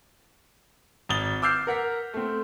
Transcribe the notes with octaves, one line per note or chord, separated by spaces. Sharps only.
G#1 D#6 A6 G7
D6 E6 F6 G6 C7
A#4 F#5 B6
A3 C4